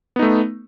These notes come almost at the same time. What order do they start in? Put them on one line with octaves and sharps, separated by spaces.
B3 D#4 A3